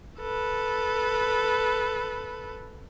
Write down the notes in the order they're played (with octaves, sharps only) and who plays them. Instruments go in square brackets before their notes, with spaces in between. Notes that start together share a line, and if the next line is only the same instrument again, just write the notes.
[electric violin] A4 B4